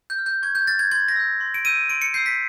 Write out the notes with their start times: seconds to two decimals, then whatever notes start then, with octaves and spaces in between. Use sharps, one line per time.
0.10 G6
0.18 F6
0.26 G6
0.42 C#6 G#6
0.55 G6
0.67 F6 A6
0.79 G#6
0.91 C6 G#6
1.08 A#6
1.16 E6 G6
1.40 C6
1.54 D7
1.65 E6 G6 D#7
1.89 C6 D7
2.02 C#7
2.14 G6 C7
2.17 E6
2.26 B6